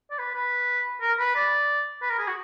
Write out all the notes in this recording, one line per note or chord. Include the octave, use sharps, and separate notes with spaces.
D5
B4
B4
A#4
B4
D5
B4
A#4
G#4
F#4